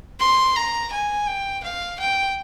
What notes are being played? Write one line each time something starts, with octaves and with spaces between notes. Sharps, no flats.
C6
A#5
G#5
G5
F5
G5